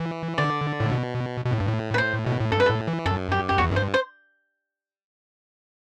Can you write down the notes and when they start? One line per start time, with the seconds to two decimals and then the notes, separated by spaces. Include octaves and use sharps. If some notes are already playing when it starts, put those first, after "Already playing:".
Already playing: E3
0.38 D3 D5
0.80 A2
0.92 B2
1.45 B2
1.52 A2
1.60 G2
1.68 A2
1.94 B4
1.98 C5
2.26 B2
2.40 A2
2.52 G2 A4
2.60 B4
2.66 A2 A4
2.87 E3
3.06 F#2 A4
3.32 G4
3.49 G4
3.58 E2 F#4
3.71 F#2
3.76 G2 C5
3.94 C5